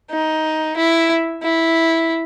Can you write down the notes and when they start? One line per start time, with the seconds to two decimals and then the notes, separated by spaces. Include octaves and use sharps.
0.11 D#4
0.77 E4
1.43 E4